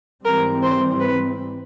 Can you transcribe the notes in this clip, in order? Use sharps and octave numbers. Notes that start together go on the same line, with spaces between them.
G#2 E3 G3 C4 A#4
C5
B4